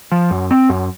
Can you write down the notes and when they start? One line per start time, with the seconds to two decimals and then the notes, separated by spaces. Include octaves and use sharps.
0.12 F3
0.31 F#2
0.51 C4
0.70 F#2